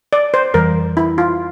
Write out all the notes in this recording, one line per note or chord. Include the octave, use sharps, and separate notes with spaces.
D5
C5
F2 E3 G3 A#4
E4
F4